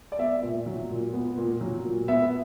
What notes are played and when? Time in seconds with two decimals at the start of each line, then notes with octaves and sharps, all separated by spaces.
0.12 D5
0.19 B3 E5
0.42 A#2
0.66 F#3
0.90 A#2
1.13 B3
1.37 A#2
1.61 F#3
1.85 A#2
2.08 B3 E5